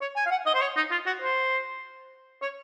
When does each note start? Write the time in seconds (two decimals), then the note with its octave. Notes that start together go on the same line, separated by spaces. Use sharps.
0.01 C#5
0.16 G#5
0.26 F5
0.31 F#5
0.46 D#5
0.55 C5
0.61 C#5
0.76 D#4
0.91 F4
1.06 F#4
1.22 C5
2.42 C#5